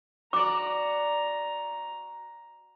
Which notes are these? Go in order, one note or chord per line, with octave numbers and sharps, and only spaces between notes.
F#4 D5 A#5 D6